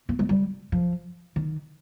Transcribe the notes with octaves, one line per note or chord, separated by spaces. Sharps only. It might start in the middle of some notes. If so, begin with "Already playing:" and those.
A#3
G#3
G3
F3
D#3